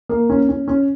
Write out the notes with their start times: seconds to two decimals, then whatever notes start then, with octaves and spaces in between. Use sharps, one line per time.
0.09 A#3
0.30 C#4
0.49 C#4
0.68 C#4